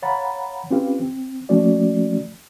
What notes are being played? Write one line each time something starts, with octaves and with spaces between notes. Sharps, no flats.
C#5 F5 F#5 A#5 B5 A6
C4 C#4 F4 G4 B4 F5
C4
F3 A3 A#3 C#4 F#4 D5